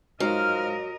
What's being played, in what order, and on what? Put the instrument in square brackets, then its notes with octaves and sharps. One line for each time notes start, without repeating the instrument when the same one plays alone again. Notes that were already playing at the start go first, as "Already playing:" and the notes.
[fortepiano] G#2 [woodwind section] F3 G#3 F6 [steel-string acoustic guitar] F#3 [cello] A#4 D#5